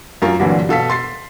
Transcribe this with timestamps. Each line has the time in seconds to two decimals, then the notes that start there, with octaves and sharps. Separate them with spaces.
0.22 F#2 F4 A#4
0.39 C2 G2 A#2 D3 E3 F#3
0.69 B2 A4 F5 B6
0.90 C6 A6 C7